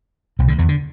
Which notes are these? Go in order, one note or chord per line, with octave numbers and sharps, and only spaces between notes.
C2 C3
D2 D3
E2 E3
D3